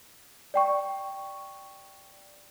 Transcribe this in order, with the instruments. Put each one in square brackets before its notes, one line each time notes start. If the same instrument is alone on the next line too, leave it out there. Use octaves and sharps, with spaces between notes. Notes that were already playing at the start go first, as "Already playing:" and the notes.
[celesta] D5 G5 C#6